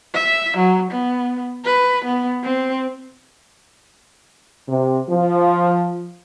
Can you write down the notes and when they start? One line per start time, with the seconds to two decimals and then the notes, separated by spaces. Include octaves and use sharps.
0.15 E5
0.58 F#3
0.91 B3
1.65 B4
2.05 B3
2.44 C4
4.68 C3
5.10 F3